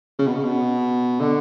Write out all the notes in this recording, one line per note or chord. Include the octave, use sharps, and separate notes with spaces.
C#3
B2
C#3
B2
D3